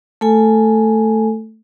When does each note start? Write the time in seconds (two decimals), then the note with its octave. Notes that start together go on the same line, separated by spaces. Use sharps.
0.21 A3 A4 G#5